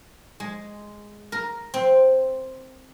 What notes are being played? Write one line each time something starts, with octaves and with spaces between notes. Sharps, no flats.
G#3
A#4
C4